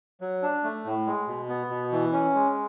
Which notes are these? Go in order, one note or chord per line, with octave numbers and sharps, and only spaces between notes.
F#3
D4
A3
A2
G#3
B2
B3
B2
E3
C#4
G#3